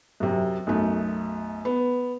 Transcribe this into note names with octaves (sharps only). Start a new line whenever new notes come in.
F#2 C3
B1 F#2 A3
B3